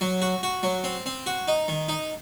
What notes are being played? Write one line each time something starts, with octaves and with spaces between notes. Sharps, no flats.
F#3
F#4
F#4
F#3
C4
C4
F#4
D#4
D#3
D#4